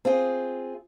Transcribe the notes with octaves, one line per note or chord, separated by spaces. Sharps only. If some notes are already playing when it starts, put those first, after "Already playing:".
C4 F4 G#4